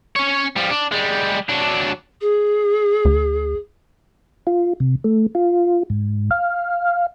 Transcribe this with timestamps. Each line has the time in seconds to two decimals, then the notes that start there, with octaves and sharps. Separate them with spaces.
0.16 C#4 C#5
0.57 F3 G3
0.71 D4
0.92 G3 G#3
1.49 F#3 D4
2.21 G#4
3.05 D2
4.47 F4
4.80 C3
5.04 A3
5.35 F4
5.90 G#2
6.31 F5